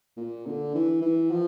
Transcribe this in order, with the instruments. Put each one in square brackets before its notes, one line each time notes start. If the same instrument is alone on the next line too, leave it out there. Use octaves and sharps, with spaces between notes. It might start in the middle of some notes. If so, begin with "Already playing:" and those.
[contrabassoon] A#2
D3
E3
E3
F3